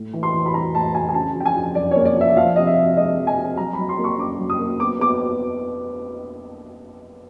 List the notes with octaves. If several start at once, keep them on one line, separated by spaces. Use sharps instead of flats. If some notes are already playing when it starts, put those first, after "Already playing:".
Already playing: A2
E3
C6
E3
B5
G3 A#5
A2 A5
A2 G#5
G#5
C#3 A5
F3
G5
G#5
F3
F#2 D5
A#3 C#5
D5
F3 E5
F3 F5
C3 D#5
E5
C4
G#3 D#5
F3
G#5
C4
F#3 A#5
F#3 B5
C6
A#3
C#6
C#4 D6
F#3
D#6
A#3
B3 D6
B3 D6